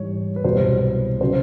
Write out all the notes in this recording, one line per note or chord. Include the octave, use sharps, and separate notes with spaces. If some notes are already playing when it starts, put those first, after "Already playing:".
Already playing: G#2 E3 G3 C#5
B4
C2 B2 F#3 C5
C#3 F#3 C5